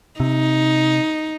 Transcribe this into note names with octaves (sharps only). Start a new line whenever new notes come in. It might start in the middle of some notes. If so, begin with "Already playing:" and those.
C3 D#4